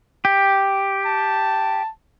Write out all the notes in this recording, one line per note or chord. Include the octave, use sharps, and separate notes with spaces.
G4
A5